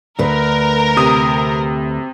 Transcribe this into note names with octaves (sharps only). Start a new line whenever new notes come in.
D2 A#4 B4
C3 D#6